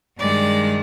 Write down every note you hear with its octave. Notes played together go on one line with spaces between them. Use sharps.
G2 D#3 G#3 D5